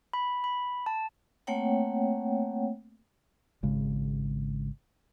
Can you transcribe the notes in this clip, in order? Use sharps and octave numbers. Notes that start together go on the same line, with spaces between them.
B5
B5
A5
A3 A#3 C4 C#5 F#5 G5
G#1 C#3 G#3